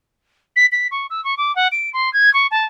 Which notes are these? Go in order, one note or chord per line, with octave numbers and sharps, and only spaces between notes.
B6
B6
C#6
E6
C#6
D6
F#5
D7
C6
G#6
C#6
A5